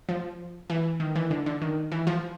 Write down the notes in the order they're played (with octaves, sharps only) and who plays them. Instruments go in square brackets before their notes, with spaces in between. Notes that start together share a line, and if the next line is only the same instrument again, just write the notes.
[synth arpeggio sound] F3
E3
D#3
E3
D3
D3
D#3
E3
F3